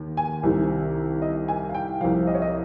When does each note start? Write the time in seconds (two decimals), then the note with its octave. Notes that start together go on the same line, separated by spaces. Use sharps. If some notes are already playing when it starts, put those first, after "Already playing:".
Already playing: D#2 D#3
0.17 G#5
0.43 C2 C3 D#3
1.22 D#5
1.48 G#5
1.69 F5
1.74 G5
2.01 C2 C3 F3 F5
2.27 D#5
2.35 C#5
2.42 D#5